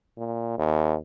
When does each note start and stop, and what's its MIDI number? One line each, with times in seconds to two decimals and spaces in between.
0.17 0.57 46
0.58 0.95 39